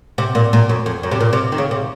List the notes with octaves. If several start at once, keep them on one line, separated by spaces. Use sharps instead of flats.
C3
A#2
A#2
F#2
F2
F#2
C3
A#2
C3
D#3
C#3
C3